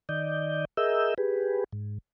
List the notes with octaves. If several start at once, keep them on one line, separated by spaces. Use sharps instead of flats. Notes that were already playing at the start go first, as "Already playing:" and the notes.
D#3 D5 D#5 G6
G#4 A#4 D#5 E5 E6 G6
G4 G#4 B4
G#2